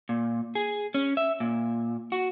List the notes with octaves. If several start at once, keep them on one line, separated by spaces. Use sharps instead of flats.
A#2
G#4
C#4
E5
A#2
F#4